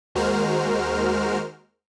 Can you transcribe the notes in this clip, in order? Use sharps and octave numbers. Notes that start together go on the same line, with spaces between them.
D#2 G#3 F#4 A#4 C5 F6